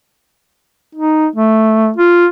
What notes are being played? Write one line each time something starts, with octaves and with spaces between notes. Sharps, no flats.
D#4
A3
F4